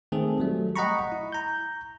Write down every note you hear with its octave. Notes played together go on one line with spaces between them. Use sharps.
D#3 A3 C4 G#4 A4
F#3 G3 A3
D#5 F#5 G5 A#5 B5 C#6
E4
A#5 G6